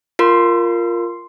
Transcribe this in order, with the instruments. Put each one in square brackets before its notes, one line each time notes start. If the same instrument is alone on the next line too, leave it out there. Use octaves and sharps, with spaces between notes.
[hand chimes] F4 A#4 [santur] C6